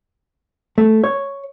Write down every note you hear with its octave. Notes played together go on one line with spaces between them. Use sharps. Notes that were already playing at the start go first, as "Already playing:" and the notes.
A3
C#5